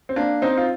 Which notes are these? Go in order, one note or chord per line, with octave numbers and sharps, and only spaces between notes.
C4
A#3 D4
C4 D#4
F4